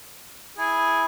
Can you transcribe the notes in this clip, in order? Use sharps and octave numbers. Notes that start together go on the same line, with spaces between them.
E4 G#4 G#5